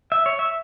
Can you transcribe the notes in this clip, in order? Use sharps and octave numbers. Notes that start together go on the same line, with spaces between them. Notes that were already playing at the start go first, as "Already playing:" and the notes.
E5
C#5
E5